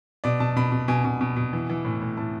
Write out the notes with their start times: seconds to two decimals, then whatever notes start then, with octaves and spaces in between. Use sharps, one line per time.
0.24 B2 D5
0.40 B2 A5
0.56 B2 B5
0.72 B2
0.88 B2 G#5
1.05 B2
1.21 B2
1.37 B2
1.53 E3
1.70 E3
1.85 A2
2.02 A2
2.17 A2 A5